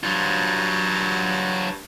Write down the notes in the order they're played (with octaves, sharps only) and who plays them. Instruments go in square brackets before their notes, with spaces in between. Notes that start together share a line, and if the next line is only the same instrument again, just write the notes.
[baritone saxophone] G2 [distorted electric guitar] F#3 F4